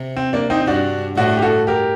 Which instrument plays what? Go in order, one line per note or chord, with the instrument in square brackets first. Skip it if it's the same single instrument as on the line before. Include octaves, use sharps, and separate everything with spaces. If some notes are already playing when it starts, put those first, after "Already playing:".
Already playing: [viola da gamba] C3
[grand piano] C4
A#3 D4
C4 D#4
D#4
[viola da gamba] G2 [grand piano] D4 F#4
[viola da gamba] A2 [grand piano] D4 F#4
[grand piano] G4
F#4 A4
G4 A#4